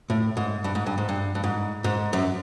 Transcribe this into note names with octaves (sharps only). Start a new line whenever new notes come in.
A2
G#2
G2
G#2
G2
G#2
G2
G2
G#2
G#2
F#2